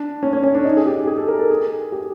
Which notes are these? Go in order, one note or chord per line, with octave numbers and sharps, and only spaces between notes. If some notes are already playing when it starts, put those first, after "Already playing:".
Already playing: D4
C#4
C#4
C#4
D4
D#4
G#4
G4
G#4
A4
A#4
A4
G#4
G4